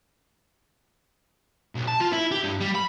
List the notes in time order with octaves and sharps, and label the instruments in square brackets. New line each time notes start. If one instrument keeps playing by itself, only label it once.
[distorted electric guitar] B1
A5
F4
E4
G4
G2
G3
B5